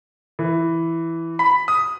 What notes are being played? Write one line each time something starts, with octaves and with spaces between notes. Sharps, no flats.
E3
B5
D#6